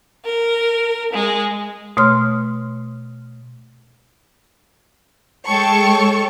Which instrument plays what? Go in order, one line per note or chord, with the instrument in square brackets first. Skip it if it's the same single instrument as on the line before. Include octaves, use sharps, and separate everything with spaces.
[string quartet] A#4
G#3
[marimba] B2 A3 C#5 C6 F6
[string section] G#3 A4 C#5 G5 C#6